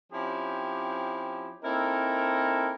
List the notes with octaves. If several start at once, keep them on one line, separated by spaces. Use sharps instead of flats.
F3 C4 C#4 E4 G4
A#3 C4 D#4 E4 A4 A#4